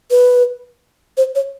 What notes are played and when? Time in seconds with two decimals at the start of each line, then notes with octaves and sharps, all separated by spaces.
0.11 B4
1.17 C5
1.35 C#5